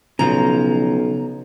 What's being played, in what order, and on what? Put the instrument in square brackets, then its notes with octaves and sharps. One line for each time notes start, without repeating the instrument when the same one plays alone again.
[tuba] B1 [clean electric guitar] C#3 F3 [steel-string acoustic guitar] A#5